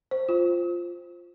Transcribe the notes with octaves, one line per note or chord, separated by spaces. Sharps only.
C5
F4